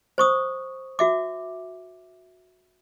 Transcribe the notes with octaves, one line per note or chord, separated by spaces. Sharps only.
C5 C#6 D#6
F#4 E5 D6